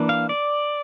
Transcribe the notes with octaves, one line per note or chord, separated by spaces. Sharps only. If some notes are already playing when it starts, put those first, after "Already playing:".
Already playing: E3 A#3 D4
F5
D5